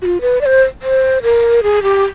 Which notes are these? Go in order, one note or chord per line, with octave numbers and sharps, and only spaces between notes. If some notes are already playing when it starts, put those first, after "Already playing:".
F#4
F4
B4
D5
C5
C5
A#4
G#4
G4